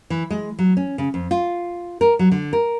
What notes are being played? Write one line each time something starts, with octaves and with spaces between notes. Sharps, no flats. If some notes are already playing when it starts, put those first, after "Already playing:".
E3
G#3
F#3
C#4
C#3
F2
F4
A#4
F#3
D3
A#4